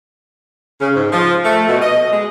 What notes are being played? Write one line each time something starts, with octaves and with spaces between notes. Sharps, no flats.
C#3
G#2
F3
A3
B2
D#5
G#3